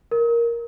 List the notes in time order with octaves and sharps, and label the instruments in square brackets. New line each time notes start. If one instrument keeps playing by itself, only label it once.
[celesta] A#4